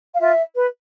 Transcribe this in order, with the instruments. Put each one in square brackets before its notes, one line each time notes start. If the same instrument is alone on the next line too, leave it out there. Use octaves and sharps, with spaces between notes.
[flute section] F5
F4 E5
B4